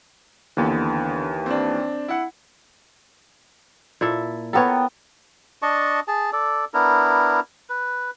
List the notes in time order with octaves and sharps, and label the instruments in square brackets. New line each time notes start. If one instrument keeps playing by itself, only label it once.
[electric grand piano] D#2 E3 [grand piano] D3 B3
[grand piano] C4 D4
E4 F#5
[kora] A#2 E4 A4
[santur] B3 G5 A#5 [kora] A4 A#4 C#5
[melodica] D4 D#5 A5 C#6
G#4 A5
A4 D5
B3 D4 E4 A#4
B4